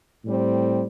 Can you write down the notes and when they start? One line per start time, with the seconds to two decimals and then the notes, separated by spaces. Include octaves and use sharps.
0.25 A2 G3 C4